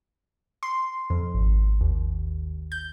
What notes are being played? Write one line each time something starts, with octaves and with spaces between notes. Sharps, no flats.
C6
F2
G#1
D#2
G6